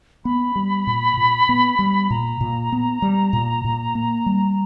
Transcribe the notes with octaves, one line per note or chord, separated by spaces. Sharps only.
B3 B5
G3
A#2
A#2
B3
G3
A#2 A#5
A#2
B3
G3
A#2
A#2
A#3
G3